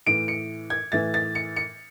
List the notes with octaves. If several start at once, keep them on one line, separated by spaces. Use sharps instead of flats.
A2 E3 D7
C#7
G#6
A2 E3 A6
A6
C#7
C#7